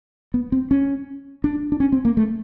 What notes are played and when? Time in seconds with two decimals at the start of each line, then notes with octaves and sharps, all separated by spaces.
0.34 B3
0.52 C4
0.71 C#4
1.44 D4
1.72 D4
1.80 C#4
1.92 C4
2.05 A#3
2.17 A3